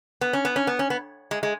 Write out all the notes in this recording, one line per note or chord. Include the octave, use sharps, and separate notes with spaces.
B3
C#4
B3
C#4
B3
C#4
B3
G#3
G#3